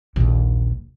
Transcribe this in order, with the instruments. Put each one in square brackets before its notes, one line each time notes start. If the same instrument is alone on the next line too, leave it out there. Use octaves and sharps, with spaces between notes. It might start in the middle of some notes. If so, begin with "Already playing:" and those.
[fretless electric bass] D#1 D#2 [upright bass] A#1